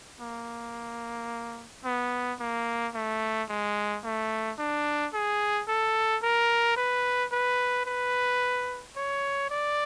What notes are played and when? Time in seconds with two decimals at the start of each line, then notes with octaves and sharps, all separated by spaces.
0.20 A#3
1.85 B3
2.40 A#3
2.94 A3
3.50 G#3
4.04 A3
4.59 D4
5.14 G#4
5.68 A4
6.23 A#4
6.76 B4
7.32 B4
7.86 B4
8.96 C#5
9.50 D5